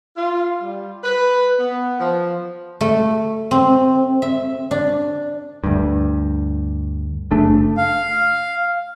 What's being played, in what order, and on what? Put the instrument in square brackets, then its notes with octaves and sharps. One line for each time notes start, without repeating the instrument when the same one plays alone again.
[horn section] F4
G3
B4
B3
F3
[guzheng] A3
C4
E5
D4
[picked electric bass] D2 G2
F#1 C#3 A3 D4
[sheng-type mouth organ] F5